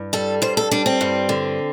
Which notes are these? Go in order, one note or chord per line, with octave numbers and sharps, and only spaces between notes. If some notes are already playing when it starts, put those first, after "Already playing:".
Already playing: G2
G3 A4
G2 C5
A4
G3 D4
C4
G2
D3